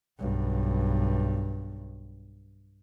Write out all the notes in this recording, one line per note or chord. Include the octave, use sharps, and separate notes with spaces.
B1 G2